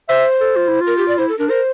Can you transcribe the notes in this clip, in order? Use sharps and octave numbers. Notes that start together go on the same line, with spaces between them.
C5 E5
A4
F4
E4
F4
A#4
G4
D5
E4 C5
A4
D4 A#4
A#4 C5